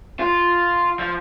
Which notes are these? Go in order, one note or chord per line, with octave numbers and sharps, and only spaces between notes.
F4
F3